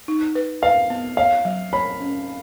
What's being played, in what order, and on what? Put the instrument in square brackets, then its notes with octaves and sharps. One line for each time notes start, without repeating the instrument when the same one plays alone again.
[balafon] D#4
B4
[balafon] B4 [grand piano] F5
[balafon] B3
[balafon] C#5 [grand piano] F5
[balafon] F#3
[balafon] C#5 [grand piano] B5
[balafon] C#4